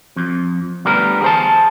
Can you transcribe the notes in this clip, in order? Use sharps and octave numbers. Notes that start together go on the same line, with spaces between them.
F2
D2 G3 B3 A#4
G#4 C5 A5